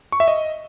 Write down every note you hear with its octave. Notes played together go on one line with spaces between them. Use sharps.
C#6
E5
D#5